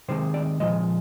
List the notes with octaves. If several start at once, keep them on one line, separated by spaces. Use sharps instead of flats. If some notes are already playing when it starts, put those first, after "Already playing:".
C3 D#3 G#3 C5
D5
A#2 F3 G#3 D#5